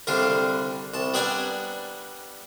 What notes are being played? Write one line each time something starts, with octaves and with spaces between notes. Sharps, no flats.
C2 D3 G3 D4 F5
C2 A5
G3 B3 D4 D5 G#5 A#5